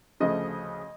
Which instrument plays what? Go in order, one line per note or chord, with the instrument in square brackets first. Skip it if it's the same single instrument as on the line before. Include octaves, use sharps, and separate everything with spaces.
[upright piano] D2 C#3 F3 A3 D#5